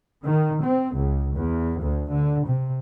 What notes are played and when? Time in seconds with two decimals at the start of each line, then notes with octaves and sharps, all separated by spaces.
0.24 D#3
0.63 C4
0.94 C#2
1.35 E2
1.79 D2
2.11 D3
2.45 C3